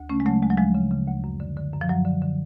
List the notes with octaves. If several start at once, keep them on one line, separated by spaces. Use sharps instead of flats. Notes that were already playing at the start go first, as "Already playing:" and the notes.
Already playing: D2
C#3 A3 C#4
G#3
C#3 F#3 A3
D2 G#3
F#3
D2 F3 G#3
C#3
C#3
D2
F#2
D3
D3
F#2
F3
F#2 F#3
D3
D3